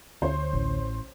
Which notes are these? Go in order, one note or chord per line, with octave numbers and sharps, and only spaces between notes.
D2 C5 C#5
A1